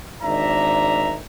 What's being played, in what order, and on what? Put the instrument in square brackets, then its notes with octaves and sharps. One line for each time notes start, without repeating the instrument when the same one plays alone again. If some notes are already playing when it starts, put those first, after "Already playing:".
[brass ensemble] G#1 D#3 D4 E5 A#5